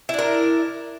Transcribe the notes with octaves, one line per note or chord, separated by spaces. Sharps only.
D4 E4 A#4